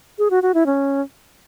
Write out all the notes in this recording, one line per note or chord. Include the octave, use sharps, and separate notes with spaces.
G#4
F#4
F#4
E4
C#4